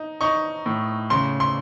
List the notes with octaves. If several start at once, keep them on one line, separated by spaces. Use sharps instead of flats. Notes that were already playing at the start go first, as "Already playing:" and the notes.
Already playing: D#4
D#4 C#6
A2
C#3 C6
C6